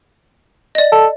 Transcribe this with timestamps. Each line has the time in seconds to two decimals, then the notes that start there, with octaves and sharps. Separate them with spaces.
0.75 D5 D#5
0.92 A4